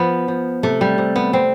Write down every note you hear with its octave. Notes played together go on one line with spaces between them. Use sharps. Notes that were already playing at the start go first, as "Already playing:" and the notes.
Already playing: F3 B3
F3
C3 A3
G3
C3
B3
G3 C4